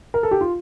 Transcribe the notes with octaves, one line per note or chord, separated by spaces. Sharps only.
A#4
A4
G4
F4